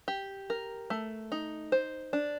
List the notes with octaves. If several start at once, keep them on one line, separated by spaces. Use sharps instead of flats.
G4
A#4
A3
D#4
C5
D4